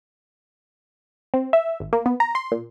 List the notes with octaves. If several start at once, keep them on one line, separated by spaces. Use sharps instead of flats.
C4
E5
G#1
A#3
B3
A#5
C6
A#2